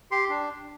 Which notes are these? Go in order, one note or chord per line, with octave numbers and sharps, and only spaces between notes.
G4 C6
D4